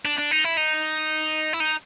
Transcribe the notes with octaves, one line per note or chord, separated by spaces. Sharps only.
D4
D4
D#4
E4
D#4
E4
D#4